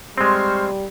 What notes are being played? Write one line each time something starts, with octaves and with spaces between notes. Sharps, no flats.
G3 G#3 C4 C5 C#6 F6